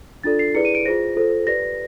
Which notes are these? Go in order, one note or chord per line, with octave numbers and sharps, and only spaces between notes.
D4 F4 A4 D5 A6
C7
E4 G#4 B4 D5 C#7
D#7
D7
F4 G#4 C5 A#6
F4 A4 C5
G4 B4 D5 A#6